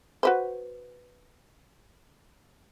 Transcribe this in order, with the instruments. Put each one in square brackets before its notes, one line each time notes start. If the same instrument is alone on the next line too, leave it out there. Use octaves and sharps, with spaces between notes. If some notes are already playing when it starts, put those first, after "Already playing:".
[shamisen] F#4 B4 C5